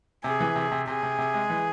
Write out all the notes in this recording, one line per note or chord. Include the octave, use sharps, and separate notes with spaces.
C3 G#4
E3
C3
C3
C3 G#4
C3
C3
G#3
E3